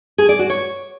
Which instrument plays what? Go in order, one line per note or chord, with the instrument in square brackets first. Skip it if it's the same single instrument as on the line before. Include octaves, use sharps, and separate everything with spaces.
[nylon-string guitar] G#4
D5
F#4
C#5